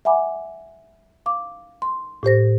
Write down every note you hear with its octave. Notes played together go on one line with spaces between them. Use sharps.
E5 F#5 G#5 B5 D6
F5 D6
C6
A2 G4 C5 A#6